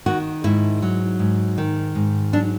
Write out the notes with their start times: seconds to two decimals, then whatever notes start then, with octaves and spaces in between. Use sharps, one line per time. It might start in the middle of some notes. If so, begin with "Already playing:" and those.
0.06 D#3 F#4
0.44 G#2 E4
0.82 F#3
1.19 G#2
1.58 D#3
1.95 G#2
2.33 F#3 D4